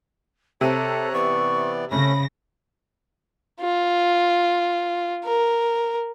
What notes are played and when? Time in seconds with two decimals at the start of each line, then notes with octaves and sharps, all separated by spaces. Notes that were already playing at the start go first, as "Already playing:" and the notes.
0.61 C3 A4 C#5 A#5 F#6
1.14 E3 B3 D5 C#6
1.91 C#3 A3 C#4 B5 A#6
3.61 F4
5.25 A#4